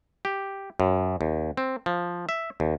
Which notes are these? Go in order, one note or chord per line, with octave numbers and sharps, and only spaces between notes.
G4
F#2
D#2
C4
F3
E5
D#2